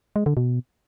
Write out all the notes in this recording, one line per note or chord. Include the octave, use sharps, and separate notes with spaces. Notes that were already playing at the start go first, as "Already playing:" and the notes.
G#3
D3
B2